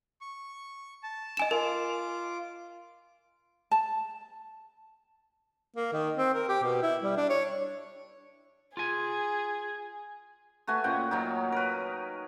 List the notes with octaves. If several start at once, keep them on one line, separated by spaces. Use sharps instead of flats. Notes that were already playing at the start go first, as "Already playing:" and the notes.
C#6
A5
D#5 G#5 E7
F4 A#4 D6
A5
A#3
D#3
C4
A#4
G4
B2
E4
G3
D4
C#5
F4 G#4 G#5
A3 F#4 B4 G#5
A#2 C#4 F#5 G5
F#3 C#4 D#4
A#4 B4